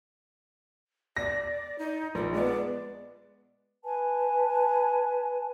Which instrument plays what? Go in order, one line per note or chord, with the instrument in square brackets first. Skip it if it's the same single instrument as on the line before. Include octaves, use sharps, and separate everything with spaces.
[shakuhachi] D5 [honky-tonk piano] A#6
[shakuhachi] D#4
[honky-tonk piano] A#1 [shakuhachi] D5
[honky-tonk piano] G#3 B3 [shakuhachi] D5
[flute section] B4 G#5 A5